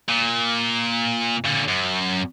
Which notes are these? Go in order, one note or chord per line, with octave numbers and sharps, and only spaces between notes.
A#2
A#2 D3
F#2